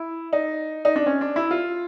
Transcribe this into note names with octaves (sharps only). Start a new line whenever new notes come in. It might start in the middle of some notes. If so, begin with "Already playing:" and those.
Already playing: E4
D#4
D#4
D4
C#4
D4
E4
F4